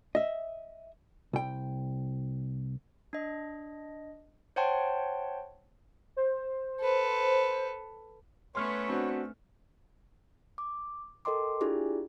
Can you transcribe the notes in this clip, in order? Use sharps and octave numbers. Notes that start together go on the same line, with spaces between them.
D#5 E5
C2 G5
D4 D#5
C5 C#5 F#5 G5 A5 C6
C5
A4 B4
A3 B3 C#4 B4 C#5 C6 F6
C4 D4 F#4
D6
A4 A#4 D#5 G5 C6 D6
D4 E4 F4 G4 G#4 D5